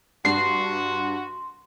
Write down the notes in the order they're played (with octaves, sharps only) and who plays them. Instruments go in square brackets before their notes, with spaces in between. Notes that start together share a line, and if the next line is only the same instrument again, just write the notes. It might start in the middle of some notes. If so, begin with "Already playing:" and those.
[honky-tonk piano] G2 D4 [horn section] F#4 [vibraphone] C6 [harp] C7